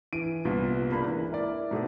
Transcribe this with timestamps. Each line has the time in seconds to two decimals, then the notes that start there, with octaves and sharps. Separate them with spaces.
0.13 E3 D7 D#7
0.45 C2 G2 A#2 B3
0.92 C#2 A#3 D4 B5
1.07 E3
1.31 E4 A#4 D5
1.71 G#2 B2 A3